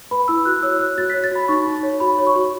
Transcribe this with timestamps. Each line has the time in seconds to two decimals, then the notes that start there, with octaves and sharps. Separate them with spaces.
0.11 B4 B5
0.28 E4 E6
0.45 F#4 F#6
0.62 C#5 E6
0.79 F#4 F#6
0.98 F#4 A6
1.10 C#5 B6
1.24 A6
1.31 F#4 B5
1.48 D#4 C#6
1.67 D#4
1.83 C#5
2.00 F#4 B5
2.18 C#5
2.27 C#6
2.36 F#4